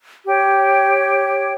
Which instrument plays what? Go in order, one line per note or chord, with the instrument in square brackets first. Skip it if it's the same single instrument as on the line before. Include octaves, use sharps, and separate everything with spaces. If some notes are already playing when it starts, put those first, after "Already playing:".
[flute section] G4 C#5 G5